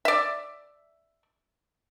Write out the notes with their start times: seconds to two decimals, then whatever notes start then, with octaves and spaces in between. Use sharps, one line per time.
0.05 D5 E5